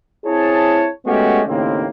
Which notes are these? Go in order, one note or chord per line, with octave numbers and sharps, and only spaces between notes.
C4 E4 G#4 C#5 A5
G#3 A3 B3 C#4 F#4 G4
D#2 A2 C#3 A#3 C4